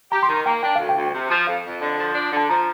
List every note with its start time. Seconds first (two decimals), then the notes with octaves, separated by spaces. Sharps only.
0.12 G4 A#5
0.23 C6
0.29 D#3 A#5
0.46 A#3 G5
0.63 D4 G5
0.76 D2 F5
0.89 G5
0.96 D2
1.14 C3
1.30 F3
1.47 F2 F5
1.65 F2
1.81 D3
1.98 F3
2.15 D4
2.32 D3 A5
2.49 F3 A#5